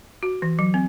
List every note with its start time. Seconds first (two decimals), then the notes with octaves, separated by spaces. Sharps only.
0.23 F#4
0.42 E3
0.59 F#3
0.74 C4